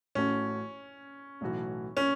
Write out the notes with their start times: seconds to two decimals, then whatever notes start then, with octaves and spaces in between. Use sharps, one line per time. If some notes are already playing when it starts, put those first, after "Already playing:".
0.15 A1 A2 A3 C#4 F#4 A4
1.41 B1 A2 E3 A3 F#4
1.97 C#4